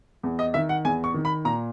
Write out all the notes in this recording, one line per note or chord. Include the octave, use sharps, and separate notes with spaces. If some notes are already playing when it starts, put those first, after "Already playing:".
E2
D#5
D#3 E5
F#5
E2 G#5
C#6
D#3
B5
A#2 A#5